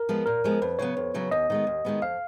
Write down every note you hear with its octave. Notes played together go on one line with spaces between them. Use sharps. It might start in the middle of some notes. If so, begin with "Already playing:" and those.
Already playing: A#4
F3 G#3 B3
A#2 A#4
F3 G#3 B3
F2 B4
C#3 F#3 B3 C#5
F2
C#3 F#3 B3
D#2 D#5
D#3 G#3 B3
D#2
D#3 G#3 B3
F2 F5